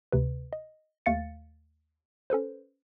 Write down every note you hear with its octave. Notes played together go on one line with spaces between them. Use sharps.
D2 C3 B4
D#5
D#2 A3 F5 A6 C#7
C#4 A4 B4 C5